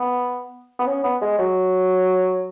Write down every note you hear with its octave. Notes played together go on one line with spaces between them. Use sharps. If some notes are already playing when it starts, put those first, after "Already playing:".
Already playing: B3
B3
C#4
B3
G#3
F#3